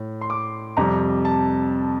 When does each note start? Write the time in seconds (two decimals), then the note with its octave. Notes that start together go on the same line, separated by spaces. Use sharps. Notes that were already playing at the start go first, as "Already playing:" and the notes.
Already playing: A2
0.21 C6
0.30 D6
0.77 F2 C3 G3 A#5
1.25 A5